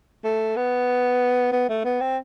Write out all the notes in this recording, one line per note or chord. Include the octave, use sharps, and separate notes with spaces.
A3
B3
B3
A3
B3
C4